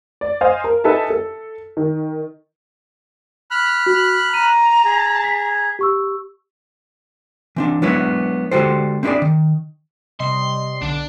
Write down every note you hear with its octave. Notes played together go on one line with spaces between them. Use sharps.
D5
C5 D#5 F5 G#5
A#4
D#4 A4 B4 E5 G#5 A5
A4
D#3
B5 F6 F#6
F#4
A#5 D#7
G#4
B6
G4 C#6 E6
E3 C4 D4
F#3 G#3 B3 D4 E4 C#5
D3 G#3 F#4 G4 A4 C5
C4 D4 E4 G4 G#4 D5
D#3
C3 G3 D#5 C6
B1 D3 D4 D7